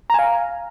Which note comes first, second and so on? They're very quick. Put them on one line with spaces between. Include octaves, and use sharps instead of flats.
A#5 G#5 F5